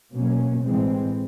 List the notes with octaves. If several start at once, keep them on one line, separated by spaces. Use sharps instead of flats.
B2 F#3 A#3 C#4
A2 E3 G#3 C4